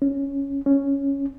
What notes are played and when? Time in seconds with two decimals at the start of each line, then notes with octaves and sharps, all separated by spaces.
0.02 C#4
0.66 C#4